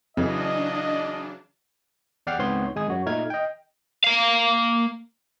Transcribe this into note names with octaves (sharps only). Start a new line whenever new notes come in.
F2 C#3 E3 F#3 D4 D#5
E2 D5 F#5 G5 F6 C7
C#2 G#2 B3 C4 C#5 C6
G#1 G#3 G#5 D#6
F#2 F#4 C#5
A#2 A3 D#4 F6 G#6
D#5 G5
A#3 F5